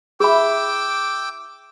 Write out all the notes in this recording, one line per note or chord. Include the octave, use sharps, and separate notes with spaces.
E4 G#4 E5 G5 B5 D6 E6